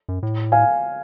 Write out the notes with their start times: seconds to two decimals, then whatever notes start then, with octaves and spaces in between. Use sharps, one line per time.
0.09 F#2
0.23 A2
0.52 F5 G#5